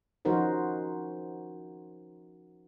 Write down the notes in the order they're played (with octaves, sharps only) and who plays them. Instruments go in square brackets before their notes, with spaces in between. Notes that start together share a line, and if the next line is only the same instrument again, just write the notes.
[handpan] F3 C#4 D#4 F#4 A#4 C5